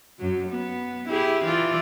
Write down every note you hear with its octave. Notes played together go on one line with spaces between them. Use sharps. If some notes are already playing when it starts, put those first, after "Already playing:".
F#2 F#3
B3
E4 G4 G#4
E3 F4 D5